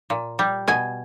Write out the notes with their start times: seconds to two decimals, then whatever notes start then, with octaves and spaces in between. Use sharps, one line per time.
0.10 A#2
0.39 G3
0.68 B2 G#5